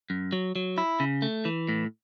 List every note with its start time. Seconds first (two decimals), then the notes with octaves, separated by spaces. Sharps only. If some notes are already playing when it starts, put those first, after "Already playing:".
0.10 F#2
0.33 F#3
0.56 F#3
0.78 E4
1.00 C#3
1.22 A3
1.45 E3
1.68 A2